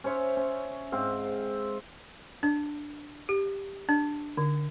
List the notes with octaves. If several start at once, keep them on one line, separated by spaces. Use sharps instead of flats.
C#4 C5 C#5 E5
C#4
G#2 C4 F5
D4
G4
D4
D3